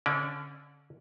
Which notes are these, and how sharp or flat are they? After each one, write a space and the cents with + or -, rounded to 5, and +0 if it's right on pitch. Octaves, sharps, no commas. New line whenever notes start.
D3 -35 C#4 -20 D5 +0